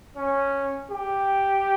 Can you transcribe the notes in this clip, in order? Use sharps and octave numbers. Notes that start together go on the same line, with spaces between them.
C#4
G4